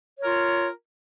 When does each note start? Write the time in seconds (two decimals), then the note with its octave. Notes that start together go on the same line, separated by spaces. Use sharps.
0.19 C#5
0.22 A#4
0.25 F4